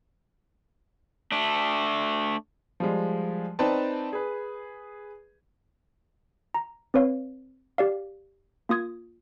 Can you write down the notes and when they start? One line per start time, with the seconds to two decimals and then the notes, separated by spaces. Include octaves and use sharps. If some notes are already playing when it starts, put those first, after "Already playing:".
1.32 A3 D4
2.80 F3 G3 G#3
3.59 C4 D#4 B4 D5 G5 A5
4.13 G#4 B4
6.54 A#5
6.94 C4 B4 C#5 F5
7.78 G4 D5 F5
8.69 A#3 F4 D#6 G#6